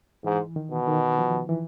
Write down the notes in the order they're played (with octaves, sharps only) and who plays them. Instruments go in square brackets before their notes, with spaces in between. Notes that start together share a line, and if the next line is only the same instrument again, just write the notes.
[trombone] G#2 [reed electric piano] E3
[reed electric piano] D#3
[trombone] B2
[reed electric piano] D#3
F3
E3